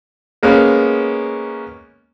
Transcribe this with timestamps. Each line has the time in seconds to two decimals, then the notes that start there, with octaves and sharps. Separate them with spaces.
0.43 G#3 A#3 B3 C#4